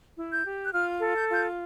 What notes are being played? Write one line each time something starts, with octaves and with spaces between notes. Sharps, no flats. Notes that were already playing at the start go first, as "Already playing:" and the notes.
E4
G6
G4
F#6
F4 F6
A4
G6
F4 G6